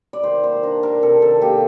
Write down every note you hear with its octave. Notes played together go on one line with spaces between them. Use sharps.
D5
D#3 C5
A#3 C5
D4 A#4
D#3 A#4
C3 A4
D#3 A4
A#3 G4